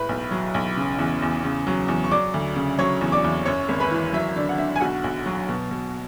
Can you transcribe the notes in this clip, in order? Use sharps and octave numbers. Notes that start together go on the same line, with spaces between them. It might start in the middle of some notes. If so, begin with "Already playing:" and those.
Already playing: A2 B4 B5
B1
F#3
B1
C#3
E2
E2
C#3
F#3
E2
C#6
F#3 D5 D6
D2
C#3
F#3 C#5 C#6
E2
D5 D6
E2
F#2 C#5 C#6
G#1
B4 B5
E3
F#3 E5
D3 D5
F#5
D3 E5
G#5
B1 F#4 F#5
B1
F#3
B2
B2